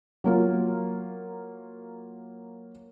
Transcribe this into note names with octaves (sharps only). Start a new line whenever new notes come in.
F#3 A#3 F4